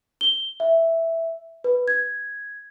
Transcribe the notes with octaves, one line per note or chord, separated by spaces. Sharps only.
G7
E5
B4
G#6